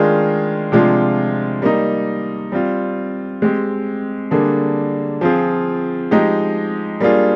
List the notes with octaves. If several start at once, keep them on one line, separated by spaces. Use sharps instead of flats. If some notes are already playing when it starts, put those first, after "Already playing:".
Already playing: D#3 G#3 D4 F4 G#4
C3 F3 G#3 D4 F4
G3 A#3 D#4
G3 C4 F4
G#3 C4 G4
D3 G3 A#3 D4 G#4
F3 C4 F4 G#4
F3 G#3 D#4 G4
G3 A#3 D4 F4 G#4